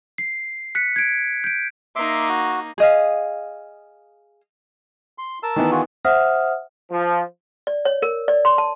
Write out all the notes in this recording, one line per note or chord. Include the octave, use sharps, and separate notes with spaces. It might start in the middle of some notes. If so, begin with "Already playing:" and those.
C7
F#6 B6 C#7
G#6 D7
G6 D7
A#3 D#4 E5 C6 D6
F#4
G#4 D#5 F5
C6
A#4 A5 E6
D#3 E3 B3
F4 F#4 G#4
C5 E5 F#5 D#6 F6
F3
D5
C#5
A#4
D5
C6
A5